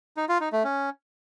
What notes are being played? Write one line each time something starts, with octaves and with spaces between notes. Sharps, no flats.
D#4
F4
D#4
A3
C#4